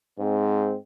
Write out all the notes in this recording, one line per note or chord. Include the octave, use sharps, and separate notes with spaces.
G#2 G#3 C4